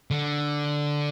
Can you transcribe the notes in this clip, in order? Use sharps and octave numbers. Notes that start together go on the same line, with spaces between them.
D3